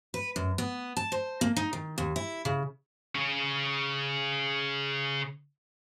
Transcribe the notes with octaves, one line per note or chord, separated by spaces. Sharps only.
B4
F#2
B3
A5
C5
A#3
D#4
D#3
D#2
E4
C#3
C#3 C#4